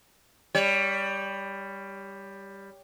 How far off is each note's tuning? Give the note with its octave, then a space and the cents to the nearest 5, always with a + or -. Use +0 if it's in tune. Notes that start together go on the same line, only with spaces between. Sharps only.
G3 +10 C#5 +35